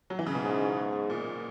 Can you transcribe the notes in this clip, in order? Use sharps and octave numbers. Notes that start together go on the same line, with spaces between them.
F#3
E3
C#3
B2
G#2
A#2